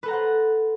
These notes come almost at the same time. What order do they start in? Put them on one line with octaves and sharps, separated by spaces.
B4 A4 A#5 F#5 C5